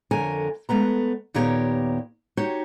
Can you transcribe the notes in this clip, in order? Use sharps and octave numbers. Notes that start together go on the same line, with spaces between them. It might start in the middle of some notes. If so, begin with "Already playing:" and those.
F2 D3 A#4 C#5 G#5
G#3 A3 B3 A#5
D#2 A#2 B3 G4 A#4 C#5
D#4 F#4 G4 C#5